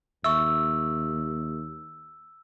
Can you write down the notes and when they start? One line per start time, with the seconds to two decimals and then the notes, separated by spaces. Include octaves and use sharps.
0.24 D#2 E5 C#6 E6